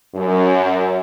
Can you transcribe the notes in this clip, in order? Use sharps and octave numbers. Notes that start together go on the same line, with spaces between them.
F#2